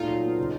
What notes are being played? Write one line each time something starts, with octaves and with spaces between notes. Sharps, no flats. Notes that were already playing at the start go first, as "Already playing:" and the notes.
Already playing: A#2 A3 D#4 F4
F#3
B3
C#3